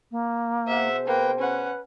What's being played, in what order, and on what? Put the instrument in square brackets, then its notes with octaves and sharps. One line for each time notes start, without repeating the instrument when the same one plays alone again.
[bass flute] A#3
[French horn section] B2 G#4 C5 [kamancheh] E5 F#5
[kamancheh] A#3 G5 [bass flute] B4
[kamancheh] C#4 F#5 [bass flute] B4